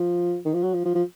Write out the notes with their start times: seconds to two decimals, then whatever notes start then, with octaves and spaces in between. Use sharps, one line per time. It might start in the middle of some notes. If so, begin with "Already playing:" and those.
Already playing: F3
0.45 D#3
0.54 F3
0.63 F#3
0.73 F3
0.85 F3
0.95 F3